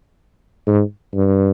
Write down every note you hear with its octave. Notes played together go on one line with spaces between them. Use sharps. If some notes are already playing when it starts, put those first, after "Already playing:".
G#2
G2